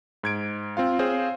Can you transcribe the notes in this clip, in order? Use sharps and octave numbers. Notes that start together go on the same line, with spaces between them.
G#2 G#6 D7
C4 F4 F5
C4 G#4 C5 C#5 F5